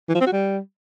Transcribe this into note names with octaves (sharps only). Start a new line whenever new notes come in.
E3
F3
C4
F#4
G3